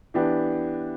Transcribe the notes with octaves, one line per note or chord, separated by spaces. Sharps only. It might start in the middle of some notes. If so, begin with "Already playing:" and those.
E3 B3 D4 G4